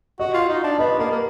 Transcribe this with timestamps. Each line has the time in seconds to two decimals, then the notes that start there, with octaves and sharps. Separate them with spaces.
0.20 F#4 D#5
0.34 F4
0.49 D#4
0.64 D4
0.79 B3 D#5
0.99 A#3
1.11 A#3